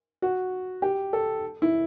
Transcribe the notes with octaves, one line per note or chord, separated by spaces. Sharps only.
F#4
G4
A4
E4